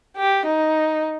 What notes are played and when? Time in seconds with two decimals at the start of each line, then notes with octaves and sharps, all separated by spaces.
0.17 G4
0.46 D#4